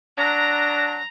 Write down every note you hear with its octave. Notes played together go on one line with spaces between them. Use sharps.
F#3 D4 A#5 A#6